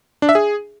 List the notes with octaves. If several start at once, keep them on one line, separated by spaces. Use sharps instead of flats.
D4
E5
G#4